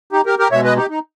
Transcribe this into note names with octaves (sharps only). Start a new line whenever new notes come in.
D#4 G4
G4 A#4
G4 A#4
B2 G#3 C#5 E5
B4 D#5
D#4 G4
D#4